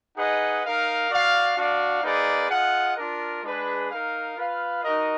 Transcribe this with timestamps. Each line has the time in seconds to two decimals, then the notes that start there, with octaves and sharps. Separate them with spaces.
0.17 D#4 G#4 B4 D#5 F#5
0.64 D#4 A#4 F5
1.10 F#4 D5 F5
1.57 D4 F#4 D5 F5
2.04 A#3 D#4 G#4 B4 D5
2.50 F4 G#4 D#5 F#5
2.96 D4 F4 A#4
3.43 G#3 D4 G#4 B4
3.90 D#4 A#4 F5
4.37 F4 B4 F5
4.83 D#4 F#4 A#4 D#5